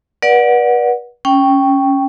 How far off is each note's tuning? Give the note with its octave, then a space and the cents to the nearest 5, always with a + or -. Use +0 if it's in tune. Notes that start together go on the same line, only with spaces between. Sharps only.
B4 -40 D5 +0 F#5 -10
C#4 +0 G5 +0